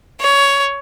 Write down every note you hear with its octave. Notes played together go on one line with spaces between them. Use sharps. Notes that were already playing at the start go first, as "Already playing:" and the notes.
C#5